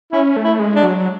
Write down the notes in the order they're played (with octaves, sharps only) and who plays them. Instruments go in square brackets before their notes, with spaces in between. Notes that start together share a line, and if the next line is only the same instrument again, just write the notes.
[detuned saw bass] C#4 [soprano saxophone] E4
[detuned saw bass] A3
[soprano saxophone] E4
[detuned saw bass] G#3
[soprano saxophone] D4
[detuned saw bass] F#3